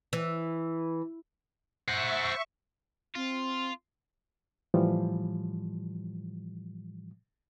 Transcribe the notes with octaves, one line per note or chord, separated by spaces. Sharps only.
E3
C5 E5 F#5 C#6
C4 F4
A2 E3 F3 G3